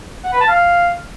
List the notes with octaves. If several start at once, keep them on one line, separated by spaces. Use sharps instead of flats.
F#5
B4
A5
F5